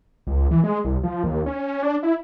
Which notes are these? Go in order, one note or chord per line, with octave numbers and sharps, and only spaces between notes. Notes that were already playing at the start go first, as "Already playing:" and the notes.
C#2
E3
G#3
C2
F3
D#2
C#4
D4
E4